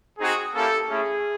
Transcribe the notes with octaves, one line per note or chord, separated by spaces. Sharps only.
C4 D#4 F#4 G#4
A#3 C#4 E4 G4 A4
A3 C#4 E4 G#4